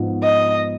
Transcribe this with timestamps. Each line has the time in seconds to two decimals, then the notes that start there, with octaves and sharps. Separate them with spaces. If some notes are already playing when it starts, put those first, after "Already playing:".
Already playing: G#2 F3 B3
0.23 D#5